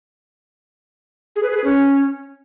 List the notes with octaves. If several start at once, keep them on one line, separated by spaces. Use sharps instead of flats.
G#4
B4
G#4
B4
C#4